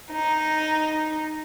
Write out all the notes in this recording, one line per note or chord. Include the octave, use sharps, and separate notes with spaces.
D#4